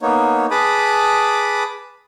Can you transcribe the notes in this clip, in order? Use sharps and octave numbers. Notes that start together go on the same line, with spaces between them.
A#3 B3 D#4 C#5
G#4 B4 A5 B5 D6 D#6